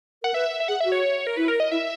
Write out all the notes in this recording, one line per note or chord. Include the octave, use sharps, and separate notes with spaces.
A#4 F#5
B4 E5
E5
G#4 F#5
E5
F#4
C#5
A#4
E4 B4
A#4
D#5
E4 E5